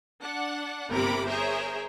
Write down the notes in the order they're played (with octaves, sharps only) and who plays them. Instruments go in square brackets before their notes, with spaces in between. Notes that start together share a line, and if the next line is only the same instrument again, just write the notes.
[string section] D4 F#5
G1 C3 A#3 A#4 B5 D6
G#4 A#4 C5 C#5 E5